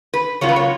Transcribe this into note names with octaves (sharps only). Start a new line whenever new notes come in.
B4
C#3 F#3 A#3 F4 C#5
B4
C#5